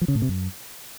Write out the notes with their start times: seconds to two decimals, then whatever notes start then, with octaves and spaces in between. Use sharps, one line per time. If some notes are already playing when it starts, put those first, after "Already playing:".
0.01 F3
0.08 C#3
0.15 A2
0.22 C3
0.29 F#2